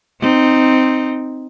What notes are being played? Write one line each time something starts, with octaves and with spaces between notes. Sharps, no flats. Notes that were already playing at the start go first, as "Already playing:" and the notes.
C4 D#4